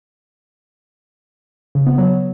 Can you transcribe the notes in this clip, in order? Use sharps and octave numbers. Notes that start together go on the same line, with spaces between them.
C#3
B3
F#3